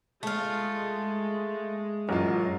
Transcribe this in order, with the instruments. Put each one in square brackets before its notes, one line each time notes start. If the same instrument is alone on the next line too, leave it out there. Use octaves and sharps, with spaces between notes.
[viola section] G#3 [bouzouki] A3 F4
[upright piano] A1 F#3 F4 [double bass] F#2